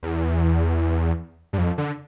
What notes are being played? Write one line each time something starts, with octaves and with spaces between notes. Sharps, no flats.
E2
G2
F2
D3